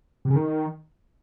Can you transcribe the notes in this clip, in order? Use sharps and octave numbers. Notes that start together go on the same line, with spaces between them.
C3
C#3
D#3